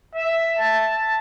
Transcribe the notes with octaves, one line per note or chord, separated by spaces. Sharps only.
E5
A5